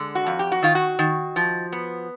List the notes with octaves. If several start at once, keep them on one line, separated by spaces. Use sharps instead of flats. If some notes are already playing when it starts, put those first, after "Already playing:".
Already playing: D3 G#3
F#4
F2
G4
F#4
D#3 F4
F#4
D#3
F3
B3